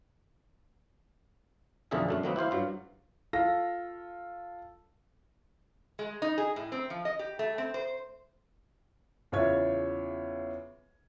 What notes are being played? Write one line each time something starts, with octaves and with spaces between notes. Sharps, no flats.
B1 F2 D3 A#3 G#4 E5
F#2 A3 D4
D#3 F#3 A#3 C4 D#4 B4
E4 G4 C5 F5
G2 F#3 F4
F4 A4 A#6
G#3
D#4
G#4
A2
C4
F3
D#5
G4
A3
C4
C5
E2 C#3 F4 C#5 E5 G#6